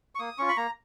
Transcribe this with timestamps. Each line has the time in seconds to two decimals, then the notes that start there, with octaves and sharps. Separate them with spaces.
0.15 C#6
0.19 A#3 D#6
0.38 C#4 F4 C#6
0.49 B5
0.57 A#3 A#5